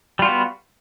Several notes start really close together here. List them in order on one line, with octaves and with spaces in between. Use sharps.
G3 F4 F#4 B3